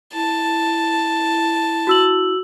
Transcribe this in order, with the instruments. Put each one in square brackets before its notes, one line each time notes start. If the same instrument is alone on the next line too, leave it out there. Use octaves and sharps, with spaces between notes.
[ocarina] E4 [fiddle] A5
[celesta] F#4 E6 F#7